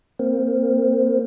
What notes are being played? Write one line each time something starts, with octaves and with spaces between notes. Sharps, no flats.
A#3 C4